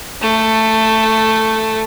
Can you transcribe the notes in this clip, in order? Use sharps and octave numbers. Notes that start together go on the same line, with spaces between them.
A3